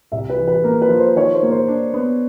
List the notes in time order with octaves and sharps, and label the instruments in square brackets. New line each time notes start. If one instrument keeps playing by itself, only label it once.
[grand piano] C2 [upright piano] E5
[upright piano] B4
[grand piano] E3
[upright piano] B4
[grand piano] A#3 [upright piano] A#4
[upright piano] B4
[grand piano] F3
[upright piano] C5
[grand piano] D#3 [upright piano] C#5
[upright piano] C5
[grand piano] A#3
[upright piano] C5
[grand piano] D4
B3